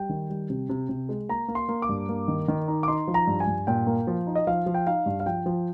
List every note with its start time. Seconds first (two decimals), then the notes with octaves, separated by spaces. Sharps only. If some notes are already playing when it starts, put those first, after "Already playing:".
Already playing: G3 G5
0.09 D#3
0.30 G3
0.50 C3
0.69 C3
0.89 C3
1.09 G#3
1.29 A#3 A#5
1.48 A#3
1.55 C6
1.69 A#3
1.82 D6
1.89 G2
2.09 A#3
2.28 D#3
2.48 D#3
2.68 D#4
2.83 D6
2.88 D#4 C6
3.08 F3
3.14 A#5
3.27 G2
3.40 G#5
3.47 G2
3.67 A#2 G5
3.87 A#3
4.07 F3
4.27 D#4
4.35 D#5
4.47 F3 F5
4.66 F3
4.74 G5
4.87 D#4 F5
5.06 G2
5.20 F5
5.26 F3 G5
5.46 F3